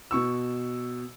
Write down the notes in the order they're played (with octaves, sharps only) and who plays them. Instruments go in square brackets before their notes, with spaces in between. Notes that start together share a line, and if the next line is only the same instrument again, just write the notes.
[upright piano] B2 C#6 E6